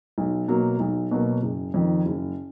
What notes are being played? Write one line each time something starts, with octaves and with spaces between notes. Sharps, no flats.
B1
B2 F#3 A#3
B1
B2 F#3 A#3
F#1
F2 D#3
F#1